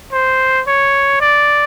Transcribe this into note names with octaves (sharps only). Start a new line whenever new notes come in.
C5
C#5
D5